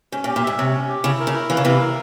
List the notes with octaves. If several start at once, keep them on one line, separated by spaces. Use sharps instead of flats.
G#2 C#4
A#2
G4
A#2
G#2 E5
C3 C#5
C#4
G4
C#3 E4
A#4
C#3
E4
E3 F5
C#3
C3 E3 E4
A#4